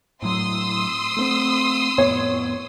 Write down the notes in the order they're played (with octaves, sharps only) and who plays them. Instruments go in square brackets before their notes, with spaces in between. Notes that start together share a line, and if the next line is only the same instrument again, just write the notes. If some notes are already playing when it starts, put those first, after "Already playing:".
[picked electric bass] A2 F#3 [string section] C6 D#6 E6
[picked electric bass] A3 B3 C4
[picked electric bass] F2 A2 B3 [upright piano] C#5